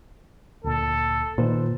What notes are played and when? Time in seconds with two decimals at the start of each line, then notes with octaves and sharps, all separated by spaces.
0.64 D2 A#2 A4
1.38 A#2 D#3 B4 C5